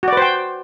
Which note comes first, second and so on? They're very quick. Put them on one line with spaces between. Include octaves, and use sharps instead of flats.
F#4 D5 B4 C5 G5